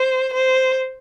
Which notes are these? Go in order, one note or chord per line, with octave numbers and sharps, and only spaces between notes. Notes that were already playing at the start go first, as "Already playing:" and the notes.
Already playing: C5
C5